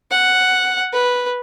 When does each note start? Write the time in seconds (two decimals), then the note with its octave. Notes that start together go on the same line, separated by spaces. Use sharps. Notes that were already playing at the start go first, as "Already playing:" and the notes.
0.11 F#5
0.93 B4